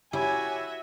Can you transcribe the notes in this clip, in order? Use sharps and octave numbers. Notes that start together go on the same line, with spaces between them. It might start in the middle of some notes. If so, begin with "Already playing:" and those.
E4 F#4 G4 C#5 E5 G#5